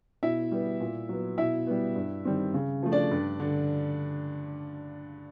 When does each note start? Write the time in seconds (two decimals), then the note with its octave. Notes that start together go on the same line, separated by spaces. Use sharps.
0.23 B2 E4 E5
0.52 G3 B3
0.80 A#2
1.09 F#3 B3
1.38 B2 E4 E5
1.67 G3 B3
1.95 G2
2.25 D#3 G3 C4
2.54 C#3
2.83 F3 A3
2.92 D4 D5
3.11 G2
3.40 D3